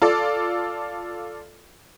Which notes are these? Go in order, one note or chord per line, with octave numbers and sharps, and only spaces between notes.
F4 A4 D5